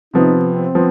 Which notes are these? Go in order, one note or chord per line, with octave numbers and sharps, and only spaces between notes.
C3 F3 B3 D#4
C4
F3 B3